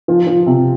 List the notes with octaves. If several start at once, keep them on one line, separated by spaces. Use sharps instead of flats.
F3
F3
C3